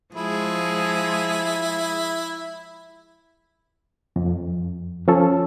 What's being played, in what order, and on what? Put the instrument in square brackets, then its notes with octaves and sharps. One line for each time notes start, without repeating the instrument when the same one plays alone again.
[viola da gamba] F3 G#3 G#4 [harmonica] E4
[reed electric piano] F2
F3 C#4 A4